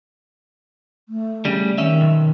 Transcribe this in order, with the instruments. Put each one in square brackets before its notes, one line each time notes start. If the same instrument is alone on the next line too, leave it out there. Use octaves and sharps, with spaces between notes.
[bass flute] A3
[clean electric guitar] C#3 G3
[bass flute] D#3 [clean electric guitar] C#4 E5
[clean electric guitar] B1